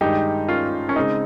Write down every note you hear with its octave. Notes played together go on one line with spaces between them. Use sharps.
G2 D#3 G#3 D#4 G4
C#4 F4
C#4
C#3 G#3 C4 D#4